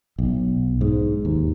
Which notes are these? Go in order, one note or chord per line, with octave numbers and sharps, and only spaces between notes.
B1
G#2
D#2